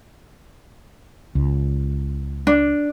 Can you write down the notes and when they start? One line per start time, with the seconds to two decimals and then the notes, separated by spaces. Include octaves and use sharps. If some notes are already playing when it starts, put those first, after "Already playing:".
1.35 C#2
2.47 D4